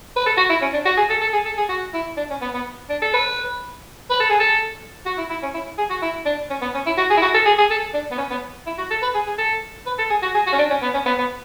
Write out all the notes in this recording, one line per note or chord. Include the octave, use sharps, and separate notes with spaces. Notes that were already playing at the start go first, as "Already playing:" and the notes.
B4
A4
F#4
E4
C#4
D4
F#4
G#4
A4
A4
G#4
A4
G#4
F#4
E4
D4
C#4
B3
B3
D4
A4
B4
B4
A4
G#4
A4
F#4
E4
E4
C#4
E4
G#4
F#4
E4
D4
C#4
B3
C#4
E4
F#4
G#4
E4
F#4
A4
G#4
G#4
A4
D4
B3
C#4
B3
E4
F#4
A4
B4
G#4
G#4
A4
B4
A4
G#4
F#4
G#4
F#4
C#4
D4
C#4
B3
C#4
B3
B3